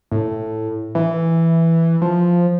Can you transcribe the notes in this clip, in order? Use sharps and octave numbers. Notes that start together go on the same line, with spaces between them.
A2
E3
F3